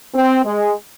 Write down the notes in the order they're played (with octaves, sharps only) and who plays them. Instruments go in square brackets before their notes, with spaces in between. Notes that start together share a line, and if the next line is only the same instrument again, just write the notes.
[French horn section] C4
G#3